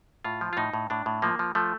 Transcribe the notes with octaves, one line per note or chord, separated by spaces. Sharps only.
A2 F4
F3
F4
A2 D#4
A2
A2 D4
A2
F3 A#3
F3
F3 A3